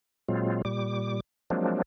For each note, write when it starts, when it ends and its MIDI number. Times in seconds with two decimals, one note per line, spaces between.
0.29 0.62 46
0.29 0.62 54
0.29 0.62 56
0.29 0.62 60
0.29 0.62 65
0.65 1.20 46
0.65 1.20 55
0.65 1.20 86
1.50 1.82 53
1.50 1.82 54
1.50 1.82 56
1.50 1.82 58
1.50 1.82 60
1.50 1.82 62